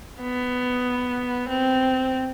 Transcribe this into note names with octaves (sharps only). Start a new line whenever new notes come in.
B3
C4